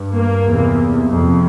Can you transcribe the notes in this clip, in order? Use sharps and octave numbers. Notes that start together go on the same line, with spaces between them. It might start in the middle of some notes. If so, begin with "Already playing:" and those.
Already playing: G2
A#3
E2 C3
F2 C3